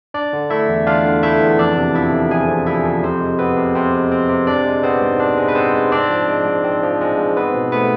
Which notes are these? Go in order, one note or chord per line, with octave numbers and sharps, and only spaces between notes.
D4 D5
D3
A3 E4 E5
E2
D4 F4 F5
D3
A3 E4 E5
E2
F2 D4 D5
C3
F3 E4 E5
F2
F2 G#4 G#5
C3
F3 E4 E5
F2
C3 C4 C5
G#3
B3 C4 B4
C3
C3 C4 C5
G#3
C4
C3
D4 D5
G#3
B3 C4 C5
G#2
D4
G#3
B4
B3 C4 C5
G#2
C4 D4 D5
F3
G#3
G#2
C4
F3
G#3
G#2
B3 C4 B4
B2
A3 B3 B4